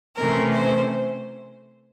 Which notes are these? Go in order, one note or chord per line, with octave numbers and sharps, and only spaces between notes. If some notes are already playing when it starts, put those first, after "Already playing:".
C3 E3 A3 C#4 A#4
C5